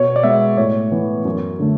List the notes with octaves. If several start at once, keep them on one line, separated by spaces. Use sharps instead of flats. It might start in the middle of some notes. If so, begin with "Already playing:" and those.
Already playing: B2 C#5
D5
G#3 B3 E5
A2 C#5
E3 B3
F#2
D3 A3